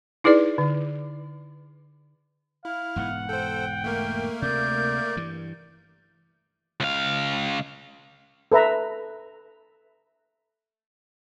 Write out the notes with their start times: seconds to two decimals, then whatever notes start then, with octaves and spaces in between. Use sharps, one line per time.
0.24 D#4 E4 G#4 B4 D5
0.58 D3
2.65 E4 F5
2.96 E1 G#2 B3 F#5
3.29 A4 C5 G5
3.84 A3 A#3 A#4
4.42 D2 C3 D5 G6
5.17 G2 E3
6.80 C#2 F5
8.52 A4 B4 E5 A#5